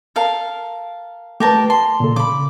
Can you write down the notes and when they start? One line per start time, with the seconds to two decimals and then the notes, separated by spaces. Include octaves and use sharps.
0.16 A4 A#4 F5
1.40 A3 G4 A#4 B4 A5
1.70 A5 C6
2.00 A#2 C#3 A4
2.16 C#3 B5 D6